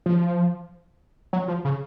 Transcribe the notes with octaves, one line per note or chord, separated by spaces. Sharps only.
F3
F#3
F3
C#3